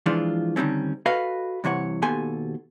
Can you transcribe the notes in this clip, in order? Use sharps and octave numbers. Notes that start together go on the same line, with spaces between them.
E3 F3 G#3 D4 F4
D3 D#3 G3 C4 C#4
F#4 A4 B4 D#5 F5
G2 C3 E3 C#5 F#5
D#2 B2 G4 A4 G#5 C6